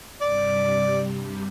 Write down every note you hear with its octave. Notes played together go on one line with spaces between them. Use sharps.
G2 C3 G3 D5